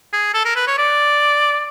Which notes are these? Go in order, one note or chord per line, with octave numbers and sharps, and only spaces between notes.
G#4
A4
A#4
B4
C#5
D5